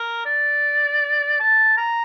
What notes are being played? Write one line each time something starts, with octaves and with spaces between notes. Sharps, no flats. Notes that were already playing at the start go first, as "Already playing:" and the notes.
Already playing: A#4
D5
A5
A#5